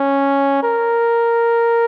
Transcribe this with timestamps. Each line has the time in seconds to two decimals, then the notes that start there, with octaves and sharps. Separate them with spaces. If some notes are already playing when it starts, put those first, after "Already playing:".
Already playing: C#4
0.63 A#4